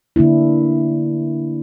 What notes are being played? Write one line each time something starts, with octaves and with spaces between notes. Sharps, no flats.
D3 A#3 D4 E4